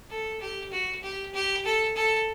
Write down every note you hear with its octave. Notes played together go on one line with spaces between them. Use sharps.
A4
G4
F#4
G4
G4
A4
A4